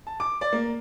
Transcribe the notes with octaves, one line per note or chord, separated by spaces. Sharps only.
A5
D6
D5
A#3